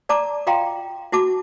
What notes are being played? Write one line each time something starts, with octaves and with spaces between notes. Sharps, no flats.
D5 A5 A#5 D6
F4 D#5 F5 G5 A#5 C6
E4 F#4 A5 D6